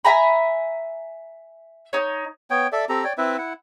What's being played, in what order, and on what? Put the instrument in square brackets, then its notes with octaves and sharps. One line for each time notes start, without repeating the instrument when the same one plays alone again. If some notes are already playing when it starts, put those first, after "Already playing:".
[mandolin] E5 G#5 A#5 B5
D#4 C#5
[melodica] B3 C#5 G5
A4 D5 E5
C4 G4 A4 A#5
C#5 D5 G5
C4 E4 B4 E5
E4 F#5